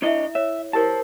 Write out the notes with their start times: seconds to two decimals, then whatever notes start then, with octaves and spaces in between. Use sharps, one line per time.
0.02 D4 E4 C#5 D#5 E5
0.35 C#5 E5
0.73 E4 G4 A#4 C5 A5